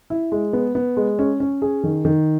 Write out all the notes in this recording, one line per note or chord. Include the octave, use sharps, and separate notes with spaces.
E4
G#3
B3
B3
G#3
C#4
C#4
G#4
D#3
D#3